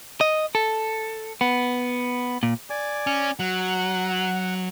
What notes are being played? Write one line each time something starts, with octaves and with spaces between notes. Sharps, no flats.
D#5
A4
B3
A#2
D5 G#5 D6
C#4
F#3 F#5